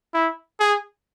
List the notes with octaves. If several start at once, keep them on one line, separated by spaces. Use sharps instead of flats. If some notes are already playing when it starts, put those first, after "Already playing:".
E4
G#4